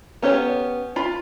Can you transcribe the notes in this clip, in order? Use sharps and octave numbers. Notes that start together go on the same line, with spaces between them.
B3 C#4 G4 C#5
F4 B5